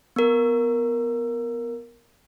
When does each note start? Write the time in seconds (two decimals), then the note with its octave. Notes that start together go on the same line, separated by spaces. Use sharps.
0.16 B3 A#4